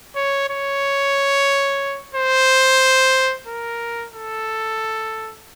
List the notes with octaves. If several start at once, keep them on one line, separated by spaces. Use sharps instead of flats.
C#5
C#5
C5
A#4
A4